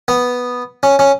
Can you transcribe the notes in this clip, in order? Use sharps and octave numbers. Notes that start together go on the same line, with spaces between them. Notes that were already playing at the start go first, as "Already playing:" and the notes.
B3
C#4
C#4